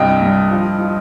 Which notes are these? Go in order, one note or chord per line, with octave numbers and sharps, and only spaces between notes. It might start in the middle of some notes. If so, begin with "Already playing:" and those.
Already playing: C2 G2 C3 D#5 G5
G2
F3
F3